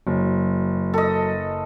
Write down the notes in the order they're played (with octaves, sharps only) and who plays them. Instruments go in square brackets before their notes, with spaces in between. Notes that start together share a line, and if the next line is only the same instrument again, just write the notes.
[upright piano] F#1 [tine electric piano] F#3
[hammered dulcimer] A4 D#5